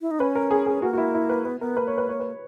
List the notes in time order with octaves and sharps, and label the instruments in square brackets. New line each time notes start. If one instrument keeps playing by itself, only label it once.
[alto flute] E4
D#4
[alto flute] C#4 [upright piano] B4
[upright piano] A#4
G#4
G#4
[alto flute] A#3 [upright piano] F#4
[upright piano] F#4
E4
E4
B4
[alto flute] B3 [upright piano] B4
[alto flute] B3 [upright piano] A#4
[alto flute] A#3 [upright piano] B4
[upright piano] C#5
B4
C#5
B4